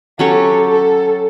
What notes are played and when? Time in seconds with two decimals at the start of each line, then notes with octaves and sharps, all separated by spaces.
0.19 F#3 C#4 G4 A4 C#5
0.70 A4